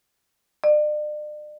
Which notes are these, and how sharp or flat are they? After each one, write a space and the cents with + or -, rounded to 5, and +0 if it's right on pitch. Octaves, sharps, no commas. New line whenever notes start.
D5 +40